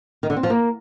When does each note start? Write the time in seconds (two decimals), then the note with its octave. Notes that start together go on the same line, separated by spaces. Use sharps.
0.23 D#3
0.30 D3
0.37 C4
0.43 F3
0.50 A#3